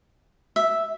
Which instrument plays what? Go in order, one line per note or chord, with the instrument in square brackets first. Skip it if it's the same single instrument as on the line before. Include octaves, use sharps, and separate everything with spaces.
[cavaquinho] E5